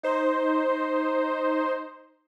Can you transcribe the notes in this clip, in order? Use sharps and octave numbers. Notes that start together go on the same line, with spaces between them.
D#4 C5